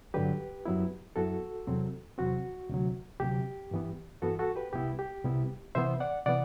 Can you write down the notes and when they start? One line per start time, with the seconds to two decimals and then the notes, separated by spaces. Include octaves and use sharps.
0.14 G2 D3 F#3 G4 B4
0.65 F#2 F#3 B3 E4
1.16 F#2 F#3 B3 E4 F#4 A4
1.67 E2 C3 F#3 C4
2.18 E2 C3 F#3 C4 F#4
2.69 D2 C3 F#3
3.20 D2 C3 F#3 G4
3.71 G2 E3 B3
4.22 G2 E3 B3 F#4 A4
4.39 F#4 A4
4.56 G4 B4
4.73 C2 C3 G3 B3 E4 G4
4.99 G4
5.24 C2 C3 G3 B3 E4
5.75 C3 E3 B3 C5 E5
6.00 D5 F#5
6.26 C3 E3 B3 D5 F#5